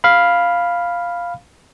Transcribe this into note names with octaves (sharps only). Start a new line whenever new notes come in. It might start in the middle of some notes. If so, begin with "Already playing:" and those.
F5 B5